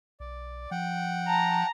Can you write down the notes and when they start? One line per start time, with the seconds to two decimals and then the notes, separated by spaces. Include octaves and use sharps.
0.20 B1 D5
0.71 F3 F#5 G5
1.28 A5 A#5